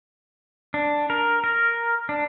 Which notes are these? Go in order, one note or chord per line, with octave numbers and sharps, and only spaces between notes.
D4
A#4
A#4
D4